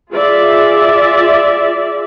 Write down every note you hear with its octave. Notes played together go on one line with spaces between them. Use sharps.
F4 G#4 D5 E5